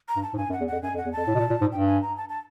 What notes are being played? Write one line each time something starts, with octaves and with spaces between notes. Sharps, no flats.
A#5
G2
A5
G#2
G2 G#5
F#2
F#5
E2
F2 F#5
F#2 G#5
F2
F#5
E2
F2 A5
A2
B2
A#2
A#2
G#2
G2 G5
G#5
A#5
A5
A5